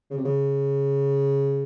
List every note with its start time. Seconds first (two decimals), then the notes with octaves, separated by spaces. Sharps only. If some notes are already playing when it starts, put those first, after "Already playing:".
0.10 C#3
0.17 C3
0.25 C#3